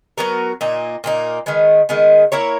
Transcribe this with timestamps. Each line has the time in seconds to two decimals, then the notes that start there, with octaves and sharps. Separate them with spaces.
0.18 F#3 B3 F#4 A#4
0.61 A#2 A#3 D#4
1.04 A#2 A#3 D#4
1.46 D#3 G#3 B3
1.89 D#3 G#3 B3
2.32 A#3 E4 A#4 C#5